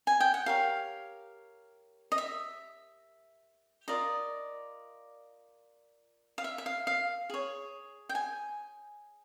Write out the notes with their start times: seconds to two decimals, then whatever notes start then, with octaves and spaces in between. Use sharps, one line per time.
0.07 G#5
0.20 G5
0.34 F#5
0.46 G4 A#4 C#5 F5
2.12 D#5
2.18 E5
3.88 F4 A#4 D5 D#5
6.38 F5
6.44 E5
6.58 E5
6.66 F5
6.87 F5
7.30 G#4 C#5
8.09 G5
8.15 G#5